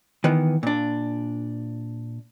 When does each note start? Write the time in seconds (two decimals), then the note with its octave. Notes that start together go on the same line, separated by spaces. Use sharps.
0.24 D#3 E3 B3
0.63 A#2 D4